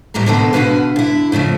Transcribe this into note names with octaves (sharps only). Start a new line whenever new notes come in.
A2 E3 G3 A3 A#5
B2 D3 D#3 B3 C4 A4
B2 D3 F#4 B4 F5
D3 E4
G#2 C#3 F3 A3